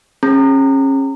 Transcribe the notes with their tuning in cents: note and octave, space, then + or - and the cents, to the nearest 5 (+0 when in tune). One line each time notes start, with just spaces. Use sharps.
C#4 -30 G#4 -15 A#5 -30